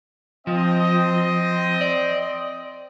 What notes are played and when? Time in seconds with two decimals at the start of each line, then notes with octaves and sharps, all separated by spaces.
0.47 F3 C4 D#5
1.81 D5